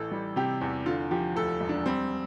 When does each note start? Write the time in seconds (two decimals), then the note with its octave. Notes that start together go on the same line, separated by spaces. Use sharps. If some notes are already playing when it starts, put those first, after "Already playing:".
Already playing: A1 E3 A4
0.12 G3
0.36 C3 G4
0.61 E2
0.86 D3 F4
1.11 F3 G4
1.36 D2 A4
1.61 E1
1.69 D4
1.86 G3 C4